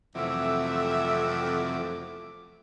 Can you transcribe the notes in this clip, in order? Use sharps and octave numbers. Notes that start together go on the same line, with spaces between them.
F2 C3 E3 F#3 A3 E5 D6